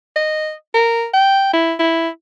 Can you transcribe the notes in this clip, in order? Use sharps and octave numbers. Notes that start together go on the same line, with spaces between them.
D#5
A#4
G5
E4
E4